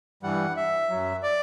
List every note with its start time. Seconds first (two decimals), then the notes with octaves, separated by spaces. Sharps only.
0.23 G2 E3 G3 F#5
0.57 E5
0.90 F#2 F#3
1.23 D5